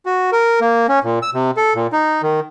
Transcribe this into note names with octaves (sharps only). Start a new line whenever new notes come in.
F#4
A#4
A#3
C#4
A#2
E6
C3
A4
A#2
D#4
D#3